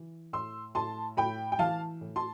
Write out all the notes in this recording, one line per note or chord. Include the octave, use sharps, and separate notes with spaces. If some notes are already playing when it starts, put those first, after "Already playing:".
Already playing: E3
A2 C6 E6
A2 A5 C6
A2 G5 B5
G5
E3 F5 A5
A2
A5 C6